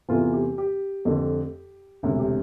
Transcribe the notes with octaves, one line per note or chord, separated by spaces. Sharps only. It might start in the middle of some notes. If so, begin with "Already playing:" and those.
E2 C3 E3 A3 F4
G4
G4
F2 D3 A3
E1 D2 C3
G4